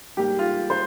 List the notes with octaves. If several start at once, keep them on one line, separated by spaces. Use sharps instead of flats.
G#2 G3 A#3 G4
F4
C5